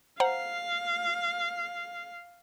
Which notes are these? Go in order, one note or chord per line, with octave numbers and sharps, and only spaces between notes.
C5 F5 F#5 A#5